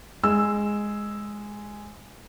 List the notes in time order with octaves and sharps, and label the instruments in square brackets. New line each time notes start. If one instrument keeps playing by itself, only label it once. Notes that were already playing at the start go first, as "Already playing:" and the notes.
[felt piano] G#3 E6